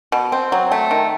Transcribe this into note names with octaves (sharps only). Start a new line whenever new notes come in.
B2
C4
F#3
A3
D#3